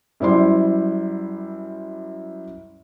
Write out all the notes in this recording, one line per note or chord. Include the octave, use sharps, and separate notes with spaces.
F#2 G3 E4 C5 D5 C6